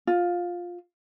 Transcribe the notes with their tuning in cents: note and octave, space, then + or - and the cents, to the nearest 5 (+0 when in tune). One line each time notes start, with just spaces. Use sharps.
F4 +10